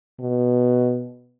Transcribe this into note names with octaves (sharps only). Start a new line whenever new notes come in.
B2